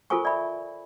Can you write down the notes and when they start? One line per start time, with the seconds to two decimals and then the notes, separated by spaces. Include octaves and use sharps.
0.10 F4 A4 A#4 C5 G#5 C#6
0.25 D5 E5 B5